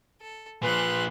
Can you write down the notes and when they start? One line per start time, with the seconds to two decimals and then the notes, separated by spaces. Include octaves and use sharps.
0.21 A4
0.63 A#2 F3 B4 C6 F#6